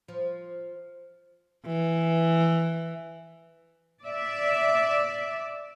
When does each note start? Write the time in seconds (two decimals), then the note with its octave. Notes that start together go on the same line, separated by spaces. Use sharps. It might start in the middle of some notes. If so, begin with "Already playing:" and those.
0.08 F3
1.66 E3
4.04 D5 E5